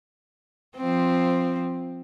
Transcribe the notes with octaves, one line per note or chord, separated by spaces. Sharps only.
F3 C4